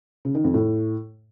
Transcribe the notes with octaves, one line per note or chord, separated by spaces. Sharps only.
C#3
D#3
F2
A2